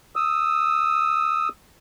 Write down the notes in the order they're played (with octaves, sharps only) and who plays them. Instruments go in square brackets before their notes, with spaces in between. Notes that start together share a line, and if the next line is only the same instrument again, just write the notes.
[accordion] D#6 E6